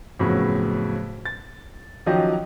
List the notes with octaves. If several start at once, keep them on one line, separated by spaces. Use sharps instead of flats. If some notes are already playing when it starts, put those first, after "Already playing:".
F2 A2 C#3 F#3 B3
A6
D#3 F3 F#3 C#4 G4 D#5